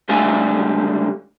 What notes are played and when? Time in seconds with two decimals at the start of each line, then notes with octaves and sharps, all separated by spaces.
0.09 C#2 D3 G3 A3 F5 G#5